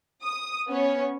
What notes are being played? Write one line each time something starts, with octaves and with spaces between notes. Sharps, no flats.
D#6
B3 C#4 C#5